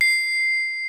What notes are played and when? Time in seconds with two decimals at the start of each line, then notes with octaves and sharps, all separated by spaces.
0.01 C7